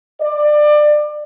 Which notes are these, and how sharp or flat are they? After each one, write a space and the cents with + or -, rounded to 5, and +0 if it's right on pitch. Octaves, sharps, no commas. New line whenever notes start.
D5 +25